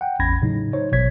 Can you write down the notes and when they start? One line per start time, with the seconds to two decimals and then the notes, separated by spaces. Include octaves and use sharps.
0.01 F#5 G5
0.20 A1 E2 C#4 B5 G#6 A#6
0.42 A2 C#3 F#3 D#4
0.73 D#4 C5 C#5
0.91 A1 B2 F#3 C#5 G#6 B6